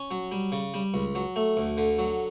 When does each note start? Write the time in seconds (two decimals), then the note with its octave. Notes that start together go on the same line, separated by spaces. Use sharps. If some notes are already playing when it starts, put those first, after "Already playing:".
Already playing: C#4
0.11 F#3
0.32 G3
0.52 C#3
0.74 G3
0.94 C#2
1.15 F#3
1.36 A3
1.57 D2
1.77 D3
1.99 F#3